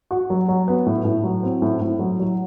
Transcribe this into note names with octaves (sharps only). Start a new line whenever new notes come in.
F#4
F#3
F#3
B3
A2
A2
F#3
C4
A2
A2
F#3
F#3